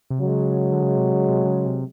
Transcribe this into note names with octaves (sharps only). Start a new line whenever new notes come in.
C3
C#3 F#3 G#3
D3
C#3
C3
C#3
C3
C#3
C3